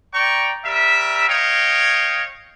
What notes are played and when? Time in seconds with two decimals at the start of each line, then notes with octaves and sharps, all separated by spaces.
0.14 D5 G5 A#5 C#6
0.65 G3 A#4 E5
1.28 C#5 D#5 F5 G5